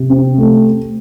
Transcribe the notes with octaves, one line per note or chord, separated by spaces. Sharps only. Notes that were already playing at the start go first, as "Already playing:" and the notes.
Already playing: C3
C4
A3